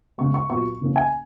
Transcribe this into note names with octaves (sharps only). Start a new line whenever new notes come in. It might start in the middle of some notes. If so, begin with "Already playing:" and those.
C#3 G#3 B3 C#6
C#6
A#2 F#3 B3 C#6
C#3 E3 A#3 C#4
G#5